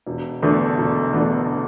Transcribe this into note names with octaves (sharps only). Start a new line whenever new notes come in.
E1
E2 D3 A3 D4
E1
E2 D3 A3 D4